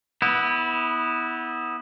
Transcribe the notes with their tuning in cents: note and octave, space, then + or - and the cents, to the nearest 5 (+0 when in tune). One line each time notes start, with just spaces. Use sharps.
B3 +0 E4 -25